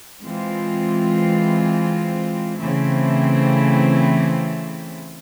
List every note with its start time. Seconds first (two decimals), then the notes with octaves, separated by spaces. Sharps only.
0.23 E3 G#3 C4 F4
2.59 C#3 E3 A3 C4 E4